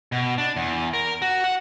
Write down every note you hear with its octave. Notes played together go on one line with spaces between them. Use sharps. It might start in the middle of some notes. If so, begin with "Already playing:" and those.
B2
D4
E2
A#4
F#4
F#5